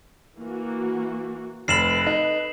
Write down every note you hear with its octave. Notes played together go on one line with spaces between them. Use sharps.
E3 A#3 F#4
F1 A4 B4 B5 C7 E7 F#7
D#4